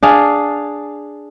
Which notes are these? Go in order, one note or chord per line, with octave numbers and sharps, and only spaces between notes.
D4 G#4 F5